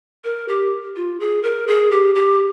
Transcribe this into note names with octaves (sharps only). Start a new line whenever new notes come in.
A#4
G4
F4
G#4
A#4
G#4
G4
G4